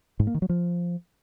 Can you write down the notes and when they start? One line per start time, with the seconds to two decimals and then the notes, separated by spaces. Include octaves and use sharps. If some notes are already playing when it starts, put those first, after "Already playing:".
0.20 G#2
0.27 A#3
0.34 D#3
0.42 F#3
0.49 F3